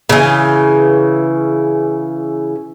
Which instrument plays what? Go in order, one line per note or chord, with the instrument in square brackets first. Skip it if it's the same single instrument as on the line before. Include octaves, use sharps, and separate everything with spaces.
[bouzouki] C#3 E3